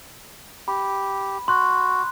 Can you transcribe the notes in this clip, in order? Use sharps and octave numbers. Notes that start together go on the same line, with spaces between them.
G4 B5
F#4 C6 F#6